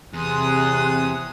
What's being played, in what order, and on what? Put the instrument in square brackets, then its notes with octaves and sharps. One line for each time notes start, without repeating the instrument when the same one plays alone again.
[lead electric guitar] E2 [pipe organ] C3 D#6 [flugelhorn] G#4 [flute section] C6 F#6